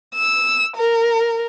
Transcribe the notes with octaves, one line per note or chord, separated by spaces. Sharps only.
E6
A#4